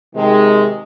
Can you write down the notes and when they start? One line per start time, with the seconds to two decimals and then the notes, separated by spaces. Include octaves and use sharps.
0.15 C3 D#3 G#3